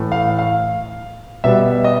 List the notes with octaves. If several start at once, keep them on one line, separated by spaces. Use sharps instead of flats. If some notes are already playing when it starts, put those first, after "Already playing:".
Already playing: A2 E3 A3
F5
F5
B2 G3 B3 E5
D#5